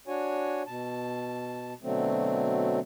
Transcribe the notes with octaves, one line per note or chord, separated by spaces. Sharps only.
D4 F#4 C#5 G#5
B2 A5
B2 D3 F#3 A3 C4